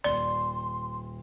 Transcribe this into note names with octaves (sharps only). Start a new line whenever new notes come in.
D#1 D5 C6 G7